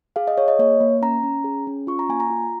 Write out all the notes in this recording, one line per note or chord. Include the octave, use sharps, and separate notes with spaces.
G#4 F5
D#5
G#4 C#5
D#5
A#3 C#5
A#3
C#4 A#5
C#4
G#4
C#4
F4 C#6
A#5
A#3 G#5
A#5
F4